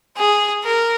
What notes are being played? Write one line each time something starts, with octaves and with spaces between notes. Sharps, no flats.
G#4
A#4